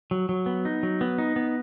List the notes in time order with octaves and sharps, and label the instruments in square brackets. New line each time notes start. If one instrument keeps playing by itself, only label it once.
[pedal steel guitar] F#3
F#3
B3
D#4
F#3
B3
D#4
B3